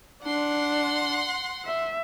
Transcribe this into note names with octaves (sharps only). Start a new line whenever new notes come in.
D4 F#5 C6
E5